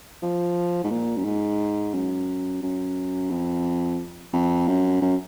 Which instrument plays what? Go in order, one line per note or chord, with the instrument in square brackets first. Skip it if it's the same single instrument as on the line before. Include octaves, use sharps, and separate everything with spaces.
[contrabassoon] F3
G#2
A#2
F#2
G#2
F#2
F#2
F2
F2
F#2
F#2